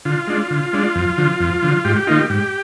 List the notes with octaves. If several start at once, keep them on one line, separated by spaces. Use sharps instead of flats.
D3 F4
G#3 D4
D3
G#3 D4
F2
D3 F3
F2
D3 F3
G#2 G4
G4
D#3 A#3 D#4 F4
G4
G#2 G4